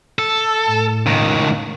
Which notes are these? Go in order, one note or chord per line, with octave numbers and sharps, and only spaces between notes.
A4
A2
C#2 D#3